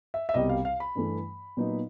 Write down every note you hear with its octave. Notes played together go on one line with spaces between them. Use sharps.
E5
E5
C2 B2 G3 D#5
F5
F5
B5
G2 E3 A3
A#2 F#3 B3 D#4